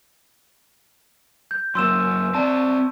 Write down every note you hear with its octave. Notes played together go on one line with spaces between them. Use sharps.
G6
F#2 A#3 C6 E6 E7
C4 D5 A5